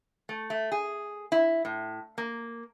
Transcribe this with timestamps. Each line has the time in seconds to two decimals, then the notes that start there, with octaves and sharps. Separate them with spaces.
0.29 A3
0.50 A3
0.72 G#4
1.32 E4
1.65 A2
2.18 A#3